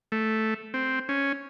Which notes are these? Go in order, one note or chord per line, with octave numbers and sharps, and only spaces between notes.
A3
C4
C#4